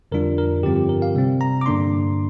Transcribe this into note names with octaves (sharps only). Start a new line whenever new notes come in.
F2 D3 G3 D4 F4 A#4
A#4
G2 D3 F3 C4 F4 G4
G4
A#4
F5
C3 G3 C4
A#5
D6
G2 D3 A#3 D4 C6